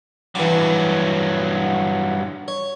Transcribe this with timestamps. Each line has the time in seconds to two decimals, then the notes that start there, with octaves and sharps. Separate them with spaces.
0.35 G2 E3 F#3 D6
2.48 C#5